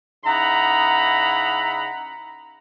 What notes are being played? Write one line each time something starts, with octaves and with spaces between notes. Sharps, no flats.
C#3 D#4 E4 F#5 A#5 B5